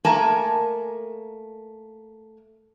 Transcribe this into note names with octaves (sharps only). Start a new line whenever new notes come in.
A3 A#3 A#4 G#5 A5